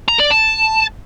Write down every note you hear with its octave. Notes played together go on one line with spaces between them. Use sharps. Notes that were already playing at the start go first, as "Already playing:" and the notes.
A#5
D5
A5